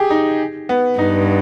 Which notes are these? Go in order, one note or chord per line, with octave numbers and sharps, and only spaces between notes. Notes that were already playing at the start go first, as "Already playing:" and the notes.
Already playing: G4 G#4
D#4
B3
G2 D#4